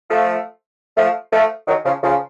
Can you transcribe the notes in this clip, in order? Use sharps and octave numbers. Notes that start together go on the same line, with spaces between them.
F3 A3
F3 A3
F3 A3
D#3 F#3
C#3 F3
C#3 F3